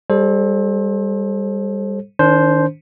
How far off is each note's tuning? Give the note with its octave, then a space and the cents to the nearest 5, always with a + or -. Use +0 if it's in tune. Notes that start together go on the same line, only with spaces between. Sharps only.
G3 +20 A4 -15 C5 +30
D#3 +5 D4 -40 C5 +0